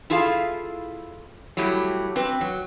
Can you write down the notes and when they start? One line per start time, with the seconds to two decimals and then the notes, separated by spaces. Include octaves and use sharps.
0.10 E4 F4 G#4 A4 F5
1.57 F#3 G3 A3 E4 G4
2.16 C4 B4
2.41 F#3